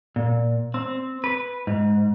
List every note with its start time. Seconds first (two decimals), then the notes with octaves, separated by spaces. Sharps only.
0.16 A#2
0.74 C4
1.24 B4
1.67 G#2